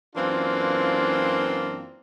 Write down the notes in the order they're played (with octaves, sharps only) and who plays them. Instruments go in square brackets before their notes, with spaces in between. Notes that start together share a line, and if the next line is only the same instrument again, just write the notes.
[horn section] F#2 E3 A#3 C4 D4 F4